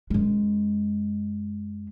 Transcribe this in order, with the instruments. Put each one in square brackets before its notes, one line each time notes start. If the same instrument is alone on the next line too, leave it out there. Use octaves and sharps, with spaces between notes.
[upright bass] F#2 G#3